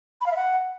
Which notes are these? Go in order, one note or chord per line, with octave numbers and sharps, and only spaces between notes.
B5
F5
E5
F#5